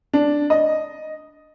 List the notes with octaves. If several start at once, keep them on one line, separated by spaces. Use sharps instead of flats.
D4
D#5